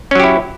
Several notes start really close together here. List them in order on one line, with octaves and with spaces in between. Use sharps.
C#4 F#3 G4 E4